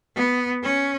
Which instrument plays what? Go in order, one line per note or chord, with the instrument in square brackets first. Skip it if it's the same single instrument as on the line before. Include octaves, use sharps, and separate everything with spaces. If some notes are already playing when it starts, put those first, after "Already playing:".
[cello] B3
C#4